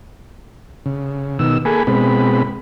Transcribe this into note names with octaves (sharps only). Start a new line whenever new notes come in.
C#3
B2 D#3 E6
A#3 G#4 A4 G#5 B5
B2 G#3 C4 B5